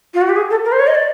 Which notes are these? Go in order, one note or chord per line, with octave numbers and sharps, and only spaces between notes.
F4
F#4
G4
G#4
A4
A#4
C5
C#5
D#5
D5